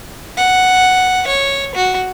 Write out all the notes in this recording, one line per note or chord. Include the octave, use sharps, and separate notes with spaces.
F#5
C#5
F#4